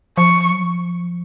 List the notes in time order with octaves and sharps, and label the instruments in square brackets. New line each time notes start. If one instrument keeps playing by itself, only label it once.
[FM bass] F3 [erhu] C#6
[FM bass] F#3
F3